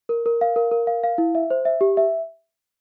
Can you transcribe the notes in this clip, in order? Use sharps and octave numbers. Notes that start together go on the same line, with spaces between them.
A#4
A#4
F5
A#4
A#4
F5
F5
E4
E5
C5
E5
G4
E5